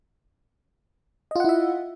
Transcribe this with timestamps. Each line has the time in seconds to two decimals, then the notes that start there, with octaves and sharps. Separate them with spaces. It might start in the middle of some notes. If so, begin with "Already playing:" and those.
1.31 D#5
1.36 F4
1.40 F#5
1.44 E4
1.49 E5